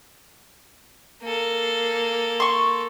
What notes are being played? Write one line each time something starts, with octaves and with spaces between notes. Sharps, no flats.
A#3 A4
C6 C#6